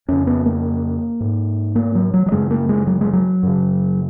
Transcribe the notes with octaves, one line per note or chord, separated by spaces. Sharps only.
F2 C#3 C#4
B3
A#3
G#2
A#3
F#3
F#3
F#3
F#2 C#3 G#3
A#3
G#3
F#3
G#3
F#3
F#2 C#3